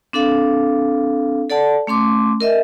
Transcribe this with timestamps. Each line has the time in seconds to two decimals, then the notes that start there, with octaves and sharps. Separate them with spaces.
0.13 C4 D4 A4 F5
1.50 A4 D5 F#5 A5
1.87 A3 C#4 C6 D6
2.40 A#4 D#5 E5